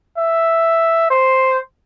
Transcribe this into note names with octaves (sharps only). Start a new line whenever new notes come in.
E5
C5